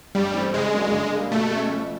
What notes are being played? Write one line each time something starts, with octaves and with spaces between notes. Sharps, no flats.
G2 G3
E3 A3 C4
C#3 G#3
F#3 A#3 D4
D3
G3 A#3
B2 A3
G#3 C#4
F2